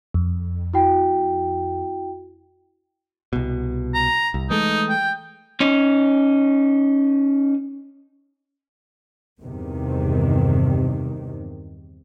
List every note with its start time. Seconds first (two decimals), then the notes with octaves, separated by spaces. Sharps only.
0.14 F2
0.74 E4 F#4 G5
3.33 C2 B2
3.94 A#5
4.34 C2
4.50 E3 G#3 A3 D#4
4.89 G5
5.60 C#4 D#4
9.41 E2 G2 C3 D#3